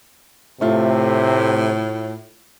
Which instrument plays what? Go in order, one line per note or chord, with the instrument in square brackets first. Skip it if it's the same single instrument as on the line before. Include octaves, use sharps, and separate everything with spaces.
[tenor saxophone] A2 [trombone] C3 [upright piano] A3 F4